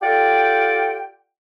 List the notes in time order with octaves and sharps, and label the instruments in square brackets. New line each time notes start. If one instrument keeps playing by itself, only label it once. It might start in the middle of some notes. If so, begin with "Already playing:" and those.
[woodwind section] F4 G4 A4 D5 F#5 G5